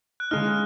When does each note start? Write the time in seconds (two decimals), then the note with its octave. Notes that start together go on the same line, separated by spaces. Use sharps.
0.20 F#6
0.31 C#3 G#3 D#4 F6